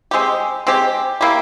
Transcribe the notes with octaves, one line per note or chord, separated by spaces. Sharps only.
G#3 C4 G4
G#3 C4 G4
A#3 E4 G4